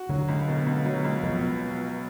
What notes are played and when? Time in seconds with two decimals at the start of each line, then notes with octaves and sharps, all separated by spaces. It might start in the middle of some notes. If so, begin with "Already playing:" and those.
Already playing: F#4
0.09 D3 F#3
0.28 C#2
0.48 B2
0.66 C#2
0.86 F#3
1.04 C#2
1.23 B2 F3